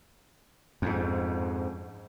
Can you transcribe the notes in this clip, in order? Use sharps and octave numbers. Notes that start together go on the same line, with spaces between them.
F2 G#2